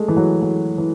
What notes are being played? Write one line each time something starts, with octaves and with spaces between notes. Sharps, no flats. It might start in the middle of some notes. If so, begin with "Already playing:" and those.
Already playing: G#3 A3
E3
F#3
F#3
E3